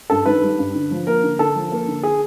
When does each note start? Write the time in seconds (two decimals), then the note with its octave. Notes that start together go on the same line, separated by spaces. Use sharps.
0.10 G2 A4
0.26 D#3 B4
0.42 G3
0.59 G2
0.75 D3
0.91 F3
1.07 A#3 A#4
1.23 D3
1.39 D3 A4
1.55 F3
1.72 A#3
1.88 D3
2.03 G#4